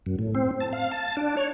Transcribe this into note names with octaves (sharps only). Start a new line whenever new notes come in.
F#2
A2
C4
A5
F5
A5
D4
C#5